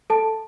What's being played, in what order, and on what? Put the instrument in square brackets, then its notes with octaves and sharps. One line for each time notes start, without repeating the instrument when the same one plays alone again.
[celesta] A4 A5